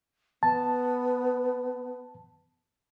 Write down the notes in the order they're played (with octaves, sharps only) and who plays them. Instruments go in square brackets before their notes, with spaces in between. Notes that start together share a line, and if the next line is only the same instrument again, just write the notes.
[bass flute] B3 [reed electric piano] A5